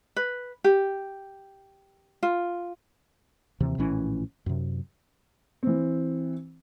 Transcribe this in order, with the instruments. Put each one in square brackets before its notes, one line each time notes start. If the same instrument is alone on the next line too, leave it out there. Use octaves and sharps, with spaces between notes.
[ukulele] B4
G4
F4
[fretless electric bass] D#2 C3 E3
A#1 A2 E3 C#4
F#2 C3
[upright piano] E3 C4